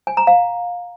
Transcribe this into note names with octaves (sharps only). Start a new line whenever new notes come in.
G#5
A#5
F5